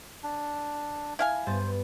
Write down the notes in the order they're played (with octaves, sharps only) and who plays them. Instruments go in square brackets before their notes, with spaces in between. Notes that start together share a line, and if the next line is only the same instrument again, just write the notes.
[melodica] D4
[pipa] E4 F5 G#5
[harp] G2 B3 A6 [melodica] C5